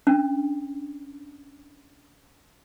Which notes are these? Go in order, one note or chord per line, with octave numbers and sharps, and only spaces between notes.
C#4 D4